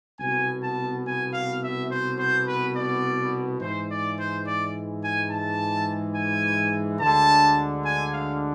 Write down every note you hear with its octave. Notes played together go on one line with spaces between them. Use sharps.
C2 B2 B3 G#5
A5
G#5
F5
E5
C5
C5
B4
D5
G#2 E3 G#3 C5
D5
C5
D5
G#5
A5
G#5
D2 D3 G#3 D4 A5
G#5
F5